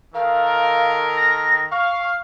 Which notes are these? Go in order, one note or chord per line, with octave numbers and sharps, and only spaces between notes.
D#3 A4 A#4 F5
A#6
F5 C#6